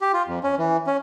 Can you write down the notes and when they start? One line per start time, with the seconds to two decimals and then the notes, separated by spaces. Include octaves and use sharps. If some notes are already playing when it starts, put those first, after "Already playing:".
0.01 G4
0.14 F4
0.27 F2
0.43 C#4
0.58 E3
0.87 C#4